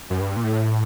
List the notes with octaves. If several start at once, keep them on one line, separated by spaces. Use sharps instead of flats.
F#2
G2
A#2
A2